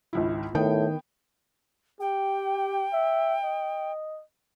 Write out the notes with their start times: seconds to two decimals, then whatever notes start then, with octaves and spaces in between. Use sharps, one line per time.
0.13 G#1 C#2 E4
0.55 A2 D#3 B3 G5
2.00 G4 G5
2.93 E5
3.44 D#5